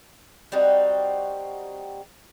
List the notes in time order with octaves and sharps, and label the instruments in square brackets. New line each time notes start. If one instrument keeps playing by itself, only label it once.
[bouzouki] G3 C4 D#4 F#4